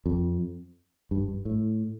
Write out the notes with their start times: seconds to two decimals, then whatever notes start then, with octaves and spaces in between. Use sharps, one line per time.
0.06 F2
1.11 G2
1.28 G2
1.45 A2